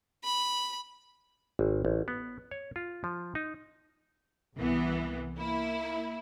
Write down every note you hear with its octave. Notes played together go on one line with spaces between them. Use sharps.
B5
G#1
A1
B3
C#5
F4
F3
D#4
C2 E3 B3
A#3 E4